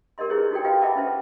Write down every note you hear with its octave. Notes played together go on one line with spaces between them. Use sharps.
G4 A#4 D5 D#5 C6
D#4 E4 G#4 B4 C#5
D#4 F#4 G4 A4 D5 G5
F4 G4 B4 D#5 F5 G5
D#5 E5 F#5 A5 B5 D6
C#4 F4 B4 C5 E5